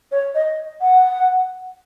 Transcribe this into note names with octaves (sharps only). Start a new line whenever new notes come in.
C#5
D#5
F#5